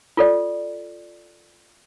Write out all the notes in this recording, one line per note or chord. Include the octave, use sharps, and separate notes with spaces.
F4 A4 D5